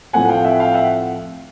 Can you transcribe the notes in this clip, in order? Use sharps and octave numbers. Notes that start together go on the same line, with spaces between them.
A2 F3 A3 C4 F#5 G#5
F#5
F5 G5
E5 F#5
F5 G5
E5 F#5